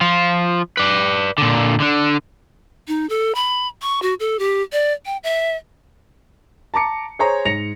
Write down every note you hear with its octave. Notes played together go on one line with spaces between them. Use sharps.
F3 F4
B4 D5
A#2 D3
D3 D4
D#4
A4
B5
C#6
F#4
A4
G4
D5
G5
E5
A5 A#5 D6 C#7
G#4 C5 C#5 G#5 A#5
G#2 A#6 C#7 F7